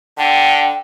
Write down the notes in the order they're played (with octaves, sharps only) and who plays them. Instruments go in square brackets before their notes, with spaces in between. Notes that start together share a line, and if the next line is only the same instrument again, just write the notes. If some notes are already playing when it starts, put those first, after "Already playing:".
[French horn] D3 [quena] G5